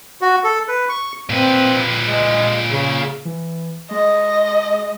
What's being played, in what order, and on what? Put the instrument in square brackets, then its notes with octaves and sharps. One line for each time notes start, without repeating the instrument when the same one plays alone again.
[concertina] F#4
A4
B4
C#6
[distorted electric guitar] A#2 B4 [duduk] C4
[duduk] G#3
C#3
[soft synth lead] E3
[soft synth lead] G#3 [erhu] D#5